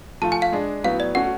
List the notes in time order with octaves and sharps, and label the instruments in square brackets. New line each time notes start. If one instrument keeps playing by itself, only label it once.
[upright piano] F3 A3 F4 [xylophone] A5
[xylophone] G#5
F5
[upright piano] G#3 D4 G#4
[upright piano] A2 F#3 B3 [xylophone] F5
[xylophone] D5
[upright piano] A3 C#4 F#4 [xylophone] F#5